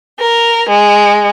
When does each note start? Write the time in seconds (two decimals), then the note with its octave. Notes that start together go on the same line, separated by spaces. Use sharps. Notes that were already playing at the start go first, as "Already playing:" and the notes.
0.19 A#4
0.68 G#3